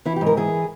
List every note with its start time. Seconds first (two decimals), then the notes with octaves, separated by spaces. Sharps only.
0.05 E3 E4
0.16 G4
0.21 G#2
0.26 A#4
0.37 E3 G#4